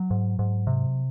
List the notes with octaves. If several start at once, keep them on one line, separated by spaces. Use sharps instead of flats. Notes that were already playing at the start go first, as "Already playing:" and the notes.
Already playing: F#3
G#2
G#2
C3